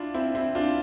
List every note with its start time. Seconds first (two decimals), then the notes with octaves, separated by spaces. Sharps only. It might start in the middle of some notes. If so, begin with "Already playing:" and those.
Already playing: D4 E4 F4
0.14 C4 E4
0.35 C4 E4
0.55 D4 F4